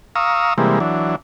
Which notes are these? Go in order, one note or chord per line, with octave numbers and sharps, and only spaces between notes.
F5 A#5 C#6 D#6 E6
C3 E3 G3 G#3 A#3
E3 F#3 D4